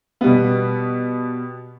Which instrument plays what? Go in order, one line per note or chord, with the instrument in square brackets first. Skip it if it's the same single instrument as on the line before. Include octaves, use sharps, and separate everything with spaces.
[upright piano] B2 G3 B3